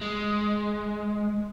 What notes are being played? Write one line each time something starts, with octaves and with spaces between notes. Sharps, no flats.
G#3